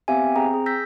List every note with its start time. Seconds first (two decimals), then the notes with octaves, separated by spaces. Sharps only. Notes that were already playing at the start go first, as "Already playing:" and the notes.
0.08 B3 C4 G4 E5 F5 G#5
0.36 C4 G#4 G5 A#5
0.54 G#4
0.66 E6 G6 A#6 B6